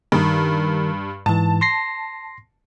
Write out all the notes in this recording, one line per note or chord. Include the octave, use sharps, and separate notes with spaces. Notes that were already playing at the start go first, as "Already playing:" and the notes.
G2 D#3 A#4
G#2 E3 A5
C6 A#6 C7